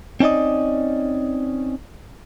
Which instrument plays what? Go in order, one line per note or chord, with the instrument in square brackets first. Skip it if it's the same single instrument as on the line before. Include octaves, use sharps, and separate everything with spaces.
[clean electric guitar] C4 C#4 D#4 D5 D#5